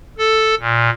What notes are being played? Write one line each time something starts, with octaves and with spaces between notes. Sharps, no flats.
A4
A#2